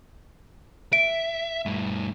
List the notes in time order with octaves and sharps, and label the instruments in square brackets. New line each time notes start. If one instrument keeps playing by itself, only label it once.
[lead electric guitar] E5 [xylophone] D7
[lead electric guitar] G2 A3